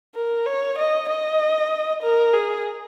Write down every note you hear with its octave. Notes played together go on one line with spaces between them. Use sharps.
A#4
C#5
D#5
D#5
A#4
G#4